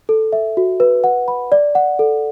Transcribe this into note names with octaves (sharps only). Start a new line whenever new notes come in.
A4
E5
F#4
B4
F#5
B5
D5
F#5
A4